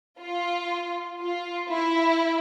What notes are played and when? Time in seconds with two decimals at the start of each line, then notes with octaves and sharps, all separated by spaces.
0.20 F4
1.21 F4
1.71 E4